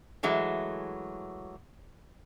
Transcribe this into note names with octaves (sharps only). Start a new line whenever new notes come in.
E3 F#3 G#3 A3